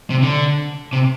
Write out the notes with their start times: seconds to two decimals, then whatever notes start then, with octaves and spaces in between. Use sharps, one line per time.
0.10 C3
0.22 D3
0.93 C3